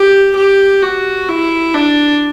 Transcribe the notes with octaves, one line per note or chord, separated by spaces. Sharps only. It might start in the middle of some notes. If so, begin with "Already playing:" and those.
Already playing: G4
G4
F#4
E4
D4